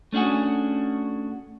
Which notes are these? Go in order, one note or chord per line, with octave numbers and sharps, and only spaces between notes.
A3 C#4 D4 F#4 G#4